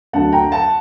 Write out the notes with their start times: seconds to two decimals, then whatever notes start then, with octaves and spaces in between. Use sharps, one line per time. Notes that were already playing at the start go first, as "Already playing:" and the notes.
0.13 D2 D3 F#3 F#5 A5
0.33 G5 A#5
0.52 F#5 A5